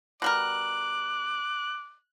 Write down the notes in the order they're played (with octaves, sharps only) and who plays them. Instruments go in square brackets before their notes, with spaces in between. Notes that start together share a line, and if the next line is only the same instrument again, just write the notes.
[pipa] B2 G3 A#4 [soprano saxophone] D6 [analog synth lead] F#6